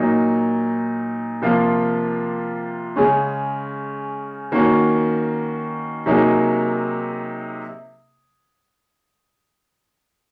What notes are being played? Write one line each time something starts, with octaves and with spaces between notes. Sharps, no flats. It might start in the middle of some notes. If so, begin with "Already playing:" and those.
Already playing: A#2 F#3 A#3 D#4
C3 F3 A#3 F4
C#3 G#3 C#4
D#3 A#3 C#4 F#4
C3 F#3 A#3 D#4 G#4